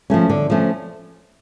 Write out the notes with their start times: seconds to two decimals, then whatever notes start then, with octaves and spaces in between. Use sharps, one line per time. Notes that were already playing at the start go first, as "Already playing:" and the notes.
0.10 F3 A3 C#4
0.30 D3
0.50 F3 A3 C#4